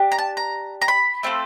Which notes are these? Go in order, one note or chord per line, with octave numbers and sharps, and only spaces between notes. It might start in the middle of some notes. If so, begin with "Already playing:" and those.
Already playing: D4 G4
A#5
A5
A#5
A#5
B5
A3 C4 F4 A4